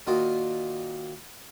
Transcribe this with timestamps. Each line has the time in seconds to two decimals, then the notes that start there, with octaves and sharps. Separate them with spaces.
0.07 A#2 D#3 F4 F#4